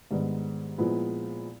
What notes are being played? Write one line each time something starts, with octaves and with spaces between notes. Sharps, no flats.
G#2 D#3 G3 B3 D4
A#2 F3 G#3 B3 E4